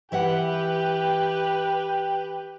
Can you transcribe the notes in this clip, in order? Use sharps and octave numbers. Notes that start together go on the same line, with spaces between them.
E3 G4 B4 E5 F#5 G5